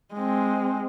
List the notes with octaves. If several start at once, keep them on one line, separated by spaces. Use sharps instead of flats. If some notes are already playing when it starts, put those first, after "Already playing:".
G#3 C4